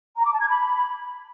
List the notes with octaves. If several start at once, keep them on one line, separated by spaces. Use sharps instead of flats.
A#5
D6
A5
G#6
B5